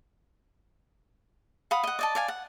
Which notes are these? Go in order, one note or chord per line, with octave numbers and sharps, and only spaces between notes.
F5 F#5 B5 D#6
D#5 F#5
D5 D#5 A5
D5 F5 G#5
F#5